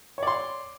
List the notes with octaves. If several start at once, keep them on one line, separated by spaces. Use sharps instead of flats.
C#5 D5 C6